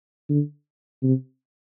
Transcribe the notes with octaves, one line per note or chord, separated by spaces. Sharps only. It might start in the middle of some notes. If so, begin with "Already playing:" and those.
D3
C3